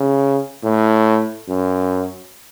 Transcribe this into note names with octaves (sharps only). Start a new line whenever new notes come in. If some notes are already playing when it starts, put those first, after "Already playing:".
Already playing: C#3
A2
F#2